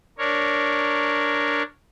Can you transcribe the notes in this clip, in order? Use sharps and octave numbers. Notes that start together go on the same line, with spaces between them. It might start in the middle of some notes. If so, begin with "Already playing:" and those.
D4 A#4 C#5